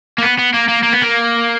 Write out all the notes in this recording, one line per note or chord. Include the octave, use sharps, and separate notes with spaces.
A#3
B3
B3
A#3
A#3
A#3
B3
A#3